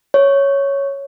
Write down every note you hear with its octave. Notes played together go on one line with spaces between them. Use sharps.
C#5